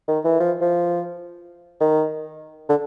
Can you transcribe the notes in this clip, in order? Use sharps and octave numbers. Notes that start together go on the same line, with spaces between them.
D#3
E3
F3
F3
D#3
D3